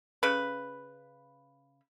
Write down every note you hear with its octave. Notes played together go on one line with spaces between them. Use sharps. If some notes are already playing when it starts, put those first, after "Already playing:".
C#3 B4